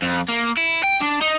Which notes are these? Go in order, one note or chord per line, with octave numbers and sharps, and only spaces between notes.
F2
A#3
E4
G5
D4
D#4